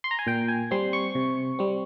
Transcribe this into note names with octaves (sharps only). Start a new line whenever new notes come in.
C6
A#5
G#5
A#2 G5
G#5
G3 C4 C6
C#6
C3
G3 C4